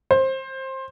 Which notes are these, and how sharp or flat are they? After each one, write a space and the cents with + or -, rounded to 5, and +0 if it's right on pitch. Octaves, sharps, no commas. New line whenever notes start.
C5 +20